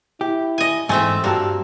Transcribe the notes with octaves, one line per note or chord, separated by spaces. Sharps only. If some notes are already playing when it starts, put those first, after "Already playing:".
E4 G4
D#5 G#5
G#2 E3 A3 C4 E5 G#5
G2 A#3 F#4 G4 A5